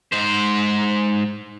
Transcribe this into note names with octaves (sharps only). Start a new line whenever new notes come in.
G#2 C5